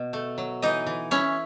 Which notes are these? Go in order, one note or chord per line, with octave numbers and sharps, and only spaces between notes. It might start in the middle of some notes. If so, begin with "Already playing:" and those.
Already playing: B2
A3
F#3
E3 D#4 D#5
E3
C#4 E4 C#5